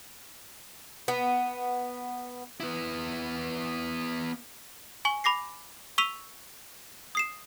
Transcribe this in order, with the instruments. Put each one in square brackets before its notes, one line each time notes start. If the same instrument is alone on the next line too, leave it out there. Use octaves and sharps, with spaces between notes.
[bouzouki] B3
[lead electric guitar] B3 E4
[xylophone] G#5 C#6 F#7
B5 D6 A#6 C7
C#6 E6 B6 D#7 F7
D#6 C7 E7